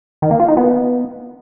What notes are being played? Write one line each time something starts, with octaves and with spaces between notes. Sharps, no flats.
D#3
A#3
F4
D#4
B3